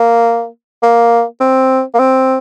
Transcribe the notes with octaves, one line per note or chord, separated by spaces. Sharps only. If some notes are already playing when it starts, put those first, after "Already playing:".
Already playing: A#3
A#3
C4
A#3
C4